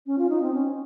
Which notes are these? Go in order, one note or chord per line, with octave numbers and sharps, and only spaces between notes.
C#4
F4
D#4
C4
C#4